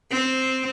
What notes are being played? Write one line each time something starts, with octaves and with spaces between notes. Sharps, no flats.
C4